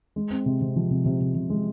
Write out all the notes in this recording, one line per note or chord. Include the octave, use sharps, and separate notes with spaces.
G#3
C4
C3
C3
F3
C3
C3
C3
C3
G#3